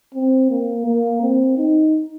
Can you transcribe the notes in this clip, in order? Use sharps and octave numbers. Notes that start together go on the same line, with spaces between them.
C4
A#3
A#3
C4
D#4